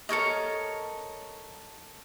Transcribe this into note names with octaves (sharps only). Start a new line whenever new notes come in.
A4 A#4 C#5 D#5